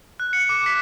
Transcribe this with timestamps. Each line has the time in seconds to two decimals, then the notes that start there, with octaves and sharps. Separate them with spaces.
0.20 F#6
0.33 C#7
0.49 D6
0.66 B6